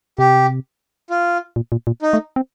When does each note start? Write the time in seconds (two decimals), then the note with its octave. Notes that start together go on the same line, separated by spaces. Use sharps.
0.19 C3 G4
1.10 F4
1.56 A#2
1.72 A#2
1.87 A#2
2.02 D#4
2.13 A3
2.36 C4